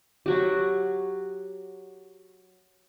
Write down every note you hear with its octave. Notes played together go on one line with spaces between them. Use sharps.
F#3 F#4 G4